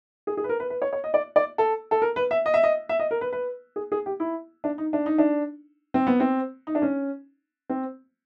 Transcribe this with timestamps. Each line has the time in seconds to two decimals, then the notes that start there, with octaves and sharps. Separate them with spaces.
0.27 G#4
0.37 G#4
0.44 B4
0.49 A#4
0.60 B4
0.70 B4
0.82 C#5
0.93 C#5
1.04 D#5
1.14 D5
1.36 D5
1.58 A4
1.91 A4
2.02 A#4
2.16 B4
2.31 E5
2.46 D#5
2.54 E5
2.63 D#5
2.89 E5
2.99 D#5
3.11 A#4
3.21 B4
3.33 B4
3.76 G#4
3.92 G#4
4.06 G4
4.20 E4
4.64 D4
4.78 D#4
4.93 D4
5.06 D#4
5.18 D4
5.94 C4
6.07 B3
6.20 C4
6.67 D#4
6.75 D4
6.82 C#4
7.70 C4